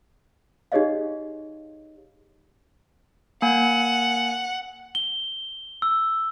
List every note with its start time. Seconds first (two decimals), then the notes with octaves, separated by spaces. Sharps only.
0.72 D#4 G4 G#4 C#5 D#5 F5
3.42 A#3 F#5 G#5
4.95 G7
5.82 E6